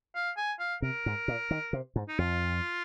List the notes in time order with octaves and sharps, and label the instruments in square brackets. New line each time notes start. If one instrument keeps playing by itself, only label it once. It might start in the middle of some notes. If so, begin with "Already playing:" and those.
[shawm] F5
G#5
F5
[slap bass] C3 [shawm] A#4
[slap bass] G#2
A#2
D#3
C3
G#2
[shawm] D#4
[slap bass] F2 [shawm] F4